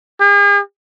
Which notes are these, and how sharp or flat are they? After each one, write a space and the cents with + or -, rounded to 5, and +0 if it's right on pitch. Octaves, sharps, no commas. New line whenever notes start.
G#4 -45